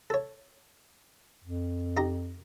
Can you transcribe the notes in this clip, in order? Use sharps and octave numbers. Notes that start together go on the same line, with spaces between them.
A4 C#5
F2
D#4 G4 A#5